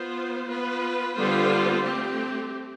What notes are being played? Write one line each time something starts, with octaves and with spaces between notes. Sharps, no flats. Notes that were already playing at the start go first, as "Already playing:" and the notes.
Already playing: B3 F4 C5
B3 F4 B4
D3 G3 B3 F4 C5
A3 C4 G4